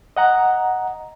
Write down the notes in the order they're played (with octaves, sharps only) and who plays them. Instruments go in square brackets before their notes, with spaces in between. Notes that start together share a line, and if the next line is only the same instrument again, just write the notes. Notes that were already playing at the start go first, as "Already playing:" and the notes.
[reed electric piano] D#5 F#5 A#5